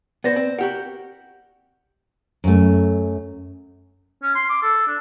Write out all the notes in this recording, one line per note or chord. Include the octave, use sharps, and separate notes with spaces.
B3 C5 D5 A#6
C4
F#4 G4 A#4 F#5
F#2 A3
C#4
C6
D6
A4
D4